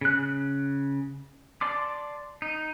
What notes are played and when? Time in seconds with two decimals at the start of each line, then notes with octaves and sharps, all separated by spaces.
0.01 C#3 F#6
1.61 D5 A5 C6 D6
2.42 D#4